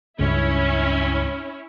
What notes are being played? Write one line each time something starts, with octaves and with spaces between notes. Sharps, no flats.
C#2 G2 C#4 E4